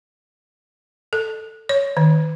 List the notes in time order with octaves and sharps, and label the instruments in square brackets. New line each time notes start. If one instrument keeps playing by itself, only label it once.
[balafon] A4
C#5
D#3